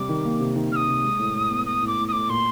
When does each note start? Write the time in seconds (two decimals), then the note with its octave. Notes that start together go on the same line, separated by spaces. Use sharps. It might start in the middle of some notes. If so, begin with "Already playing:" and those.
Already playing: C3 G3 D6
0.09 D#3
0.25 A#3
0.40 C3
0.56 D#3
0.72 D#3 D#6 F6
0.88 C3
1.04 G#3
1.19 A2
1.35 A2
1.50 B3
1.66 B3 D#6
1.82 A2 D6
1.98 A2
2.08 D#6
2.12 A2 D6
2.29 A#2 C6